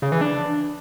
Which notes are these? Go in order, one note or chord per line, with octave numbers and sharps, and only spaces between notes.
C#3
E3
D4